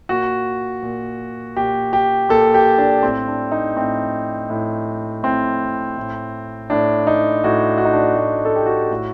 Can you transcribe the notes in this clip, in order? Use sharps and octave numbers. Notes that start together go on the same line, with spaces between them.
A#2 F#4
A#2
A#2 G4
G4
A#2 A4
G4
D4
A2 C4
D4
D#4
A2 C4
A2
A2 C4
A2
A2 D4
D#4
A2 F#4
F#4
D#4
D4
A2 F#4
A4
G4
F#4
A2